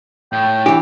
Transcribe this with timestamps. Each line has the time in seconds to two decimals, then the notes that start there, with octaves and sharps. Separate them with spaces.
0.33 A2 G5
0.66 E3 D4 G4